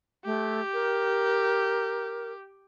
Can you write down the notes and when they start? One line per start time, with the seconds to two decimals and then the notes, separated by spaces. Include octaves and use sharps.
0.25 A3 G4
0.74 A#4